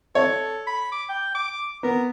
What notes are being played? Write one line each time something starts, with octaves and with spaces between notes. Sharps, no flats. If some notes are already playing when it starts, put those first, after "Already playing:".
A4 C#5
B5
D6
G5
D6
B3 A#4